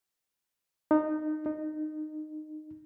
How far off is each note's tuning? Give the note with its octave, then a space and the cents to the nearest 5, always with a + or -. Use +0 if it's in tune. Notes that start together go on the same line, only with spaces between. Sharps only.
D#4 -20
D#4 -20